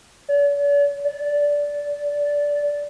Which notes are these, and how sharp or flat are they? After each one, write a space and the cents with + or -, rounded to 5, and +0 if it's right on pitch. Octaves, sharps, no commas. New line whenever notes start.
D5 -45
D5 -15